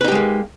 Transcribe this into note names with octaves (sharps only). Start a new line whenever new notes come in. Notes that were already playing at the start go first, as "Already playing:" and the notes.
G#3 A#3 D#4 G4 B4